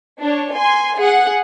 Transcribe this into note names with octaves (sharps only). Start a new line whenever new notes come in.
D4 C#5
G#5 C6
G#4 F#5